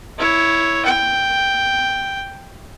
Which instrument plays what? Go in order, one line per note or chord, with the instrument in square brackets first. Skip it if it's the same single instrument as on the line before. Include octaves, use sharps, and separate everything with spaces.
[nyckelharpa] E4 C#5
G5